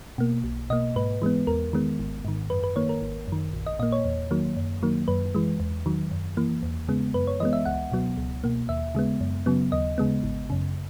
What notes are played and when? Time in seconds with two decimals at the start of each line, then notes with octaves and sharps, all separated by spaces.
0.18 B2 A#3
0.44 B1
0.70 B2 A#3 D#5
0.96 G#2 B4
1.22 E3 G#3 B3
1.47 E2 A#4
1.73 D#3 G#3 B3
1.99 G#1
2.25 G#2 D#3
2.50 F#2 B4
2.64 B4
2.76 D#3 A#3 C#5
2.89 A#4
3.02 G#1
3.28 F#2 D#3
3.53 A#1
3.66 D#5
3.79 A#2 A#3 D#5
3.92 C#5
4.05 E2
4.31 D#3 F#3 A#3
4.56 F#2
4.83 D#3 F#3 A#3
5.08 F#2 B4
5.35 E3 G#3
5.60 E2
5.86 D#3 F#3
6.11 F#2
6.37 E3 A#3
6.63 E2
6.88 C#3 G#3 B3
7.14 F#2 B4
7.27 C#5
7.40 E3 G#3 B3 D#5
7.53 E5
7.66 C#2 F#5
7.91 B2 F#3 B3
8.17 C#2
8.44 B2 A#3
8.69 D#2 E5
8.95 C#3 G#3 B3
9.21 F#2
9.46 C#3 F#3 B3
9.72 D#2 D#5
9.98 C#3 G#3 B3
10.23 G#1
10.50 F#2 C#3